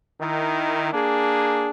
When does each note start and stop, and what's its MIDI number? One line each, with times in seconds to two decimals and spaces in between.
0.19 0.92 51
0.19 0.92 64
0.93 1.69 58
0.93 1.69 62
0.93 1.69 68